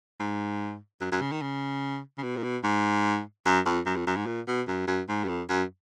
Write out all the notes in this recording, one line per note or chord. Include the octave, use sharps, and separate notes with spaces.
G#2
F#2
F#2
C#3
D#3
C#3
C#3
B2
A#2
B2
G#2
F#2
F2
F#2
F2
F#2
G#2
A#2
B2
F#2
F#2
G#2
F#2
F2
F#2